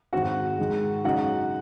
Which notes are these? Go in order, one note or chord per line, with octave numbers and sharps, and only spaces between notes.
G#2 D#3 G#3 C4 F#4 F#5
G#2 D#3 G#3
F#2 C#3 G#3 D#4 F#4 F#5